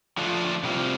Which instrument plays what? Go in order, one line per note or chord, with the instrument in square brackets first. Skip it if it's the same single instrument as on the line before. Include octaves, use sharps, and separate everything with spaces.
[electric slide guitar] D3 F3 A3 D4 F4
C3 G3 C4 F4